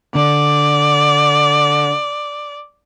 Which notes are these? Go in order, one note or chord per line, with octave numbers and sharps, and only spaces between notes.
D3 D5